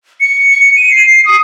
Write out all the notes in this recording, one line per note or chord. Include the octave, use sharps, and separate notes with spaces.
C#7
C#7
D#7
C7
D#6